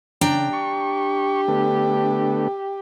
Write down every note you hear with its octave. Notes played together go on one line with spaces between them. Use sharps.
C#3 D4 G5 A#5
G4 C#6
D3 A3 B3